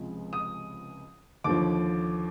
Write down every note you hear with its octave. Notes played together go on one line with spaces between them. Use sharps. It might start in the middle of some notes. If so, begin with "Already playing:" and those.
Already playing: C#2 C3 F3 G#3
D#6
D#2 D3 F3 D6